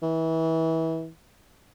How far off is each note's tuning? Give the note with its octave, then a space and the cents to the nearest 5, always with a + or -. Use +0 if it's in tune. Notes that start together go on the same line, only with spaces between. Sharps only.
E3 -25